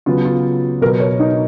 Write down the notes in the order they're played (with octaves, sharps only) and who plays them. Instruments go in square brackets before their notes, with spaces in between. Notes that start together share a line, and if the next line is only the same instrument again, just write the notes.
[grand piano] C#3 F#3 B3 F4
F4
B2 F#3 B3 A#4
C#5
D#4